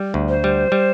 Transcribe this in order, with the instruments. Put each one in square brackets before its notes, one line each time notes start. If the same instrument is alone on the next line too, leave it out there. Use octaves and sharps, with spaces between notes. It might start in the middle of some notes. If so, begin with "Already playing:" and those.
Already playing: [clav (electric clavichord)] G3
D2
[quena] C5
[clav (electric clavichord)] G3
G3